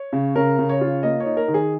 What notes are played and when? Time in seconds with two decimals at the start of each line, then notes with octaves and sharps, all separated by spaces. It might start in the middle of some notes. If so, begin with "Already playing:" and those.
Already playing: C#5
0.13 C#3
0.36 C#3 A#4
0.59 C#3
0.69 C#5
0.81 F4
1.03 A#3 D#5
1.20 C#5
1.25 D#4
1.37 A#4
1.48 D#3
1.54 G#4